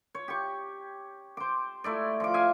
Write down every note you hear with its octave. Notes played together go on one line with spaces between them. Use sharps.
C#5
G4 C#6
C5 D6
A3 E4 D5
F3 D6
E5 F5 G#5